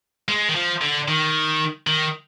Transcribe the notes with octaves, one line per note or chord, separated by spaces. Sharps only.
G#3
D#3
F3
D3
D#3
D#3